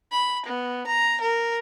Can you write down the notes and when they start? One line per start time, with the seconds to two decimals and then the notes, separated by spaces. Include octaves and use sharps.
0.12 B5
0.45 B3
0.87 A#5
1.21 A#4